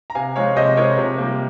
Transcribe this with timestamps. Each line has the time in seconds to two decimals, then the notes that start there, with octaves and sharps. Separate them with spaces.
0.10 A#5
0.15 C3 F5 G#5
0.36 F3 G#3 C4 C#5 F5
0.56 C3 C5 D#5
0.77 F3 G#3 C4 A#4 C#5
0.98 C3
1.18 G3 A#3